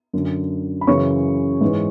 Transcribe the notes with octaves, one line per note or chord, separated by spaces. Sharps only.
F#2 D3
B5
F#2 C#3 E3 C#5 C#6
G#2 E3